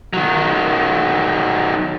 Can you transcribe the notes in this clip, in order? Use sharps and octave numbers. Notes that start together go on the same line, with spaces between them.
D#3 F#3